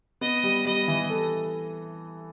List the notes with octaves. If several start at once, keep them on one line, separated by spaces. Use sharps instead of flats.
B3 D#5
G3
G3 D#5
E3
A4